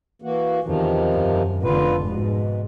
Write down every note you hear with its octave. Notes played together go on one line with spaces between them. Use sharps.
E3 A#3 F#4
E2 C3 D#3 F3
F#2
F1 D3 F4 B4
G#2 B2